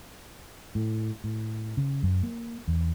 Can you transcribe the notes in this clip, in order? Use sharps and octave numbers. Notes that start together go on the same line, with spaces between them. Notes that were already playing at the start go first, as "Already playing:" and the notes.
A2
A2
C#3
F#2
A#3
E2